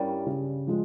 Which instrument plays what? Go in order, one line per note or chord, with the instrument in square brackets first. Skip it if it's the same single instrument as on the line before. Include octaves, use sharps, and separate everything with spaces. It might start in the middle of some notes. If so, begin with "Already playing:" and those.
Already playing: [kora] G2 G3 [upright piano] C#4 E4 A#4
[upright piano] C#3
F3 G#3